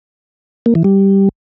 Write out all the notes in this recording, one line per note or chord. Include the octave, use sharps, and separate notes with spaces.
A#3
E3
G3